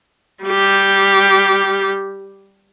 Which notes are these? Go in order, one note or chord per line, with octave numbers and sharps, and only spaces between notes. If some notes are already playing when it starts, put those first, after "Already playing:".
G3 G4